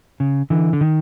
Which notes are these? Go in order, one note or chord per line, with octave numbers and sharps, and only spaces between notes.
C#3
D3 E3
D3
D#3